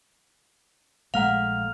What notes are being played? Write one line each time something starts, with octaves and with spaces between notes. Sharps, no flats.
A#1 G#3 A3 F5 F#5 A#5 F6 F7